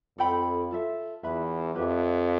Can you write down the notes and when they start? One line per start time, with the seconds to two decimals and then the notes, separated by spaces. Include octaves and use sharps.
0.18 F2 A4 C5 G5 B5
0.71 F4 A4 E5
1.23 E2 F4 B4 E5 B5
1.75 F2 G4 B4 E5